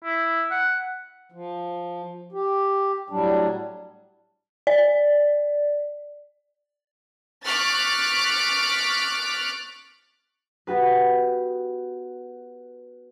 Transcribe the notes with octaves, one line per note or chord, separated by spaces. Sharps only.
E4
F#5
F3
G4
A2 F#3 G3 D4
D5
C#6 D6 F6 F#6 A6 B6
B3 F#4 G4 B4